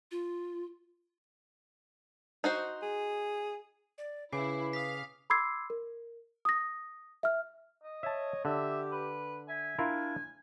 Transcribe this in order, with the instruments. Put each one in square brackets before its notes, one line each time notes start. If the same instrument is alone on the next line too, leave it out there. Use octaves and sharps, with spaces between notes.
[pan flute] F4
[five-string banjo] D#4 F#4 C5
[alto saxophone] G#4
[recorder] D5
[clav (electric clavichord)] C#3 [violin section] E4 [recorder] B4 [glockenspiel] G#5 D6 C7
[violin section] F5 [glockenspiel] D#6 B6
[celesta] B5 C6 D6 E6 G#6 C7
A#4
D#6 A#6
E5 F6
[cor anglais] D#5
[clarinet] C#5 [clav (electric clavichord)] E5 A5
[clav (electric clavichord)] D3 [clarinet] G4 [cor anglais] E5
[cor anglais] B4
[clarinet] E5 [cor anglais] G#5
[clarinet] D4 [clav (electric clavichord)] E4 F4 A#4